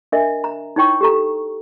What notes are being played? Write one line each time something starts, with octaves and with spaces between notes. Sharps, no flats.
D4 A#4 D#5 E5
A#5
D#4 E4 C#5 G5 C#6
G4 A4 A#5